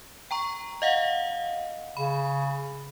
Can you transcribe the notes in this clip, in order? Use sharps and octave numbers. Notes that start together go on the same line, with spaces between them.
G5 A#5 C#6
D#5 F5 F#5
C#3 B5